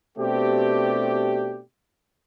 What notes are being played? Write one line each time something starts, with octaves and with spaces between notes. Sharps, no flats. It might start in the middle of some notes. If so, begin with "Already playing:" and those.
B2 A3 C4 D4 G4